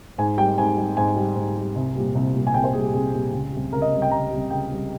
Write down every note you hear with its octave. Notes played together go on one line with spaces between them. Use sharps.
G#2 G#5
G3 G5
G#2 G#5
G3
G#2 G#5
G3
G#2
G3
C2
A#2 G3
C2
A#2 G3
G#5
C2 G5
C5
A#2 G3 G#4
G4
C2 G#4
A#2 G3
C#2
C3 G3
C#2 A#4
D#5
C3 G3
G5
C#2 A#5
C3 G3
C#2 G5
C3 G3